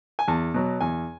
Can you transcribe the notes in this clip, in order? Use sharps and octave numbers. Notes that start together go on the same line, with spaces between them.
G#5
E2 A5
B2 F#3
E2 G#5